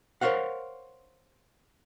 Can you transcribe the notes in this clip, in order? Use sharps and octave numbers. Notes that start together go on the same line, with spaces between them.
A#4 C5 C#5 F5 F#5